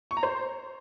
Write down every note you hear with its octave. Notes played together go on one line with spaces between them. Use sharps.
C#6
A#5
C5